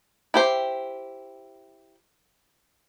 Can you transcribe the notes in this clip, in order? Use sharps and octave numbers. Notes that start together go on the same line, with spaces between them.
E4 G4 C5